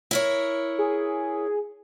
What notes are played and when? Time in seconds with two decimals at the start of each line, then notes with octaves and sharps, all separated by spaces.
0.11 E4 A#4 C#5
0.79 G#4